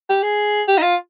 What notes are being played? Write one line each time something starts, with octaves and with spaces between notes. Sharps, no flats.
G4
G#4
G4
D#4
F4